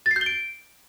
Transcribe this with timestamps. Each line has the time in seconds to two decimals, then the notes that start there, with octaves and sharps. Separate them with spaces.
0.06 A6
0.11 C7
0.16 G6
0.21 G7
0.26 D7